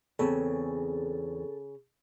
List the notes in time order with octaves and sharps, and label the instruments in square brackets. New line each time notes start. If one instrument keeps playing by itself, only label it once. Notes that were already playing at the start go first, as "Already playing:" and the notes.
[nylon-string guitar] E2 C4 [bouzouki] C#3 [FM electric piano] A4